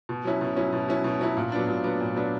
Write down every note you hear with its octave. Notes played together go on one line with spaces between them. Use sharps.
B2
F#3 C#4 E4
B2
F#3 C#4 E4
B2
F#3 C#4 E4
B2
F#3 C#4 E4
A#2
F#3 B3 D4
A#2
F#3 B3 D4
A#2
F#3 B3 D4